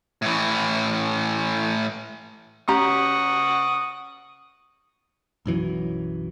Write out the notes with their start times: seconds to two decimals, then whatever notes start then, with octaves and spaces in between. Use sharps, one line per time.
0.22 A2 E3
2.68 C#4 G4 F#5 A#5 C#6 D#6
5.46 B1 F#2 E3 F#3